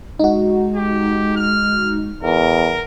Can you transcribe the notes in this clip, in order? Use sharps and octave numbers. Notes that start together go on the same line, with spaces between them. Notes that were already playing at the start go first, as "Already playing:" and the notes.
G#3 D#4 F#4
G4
F6
E2 A#4